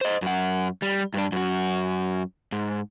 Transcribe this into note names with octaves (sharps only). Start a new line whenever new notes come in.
C5 D#5
F#2 F#5
G3
G2 D4
F#2 F#4
G#2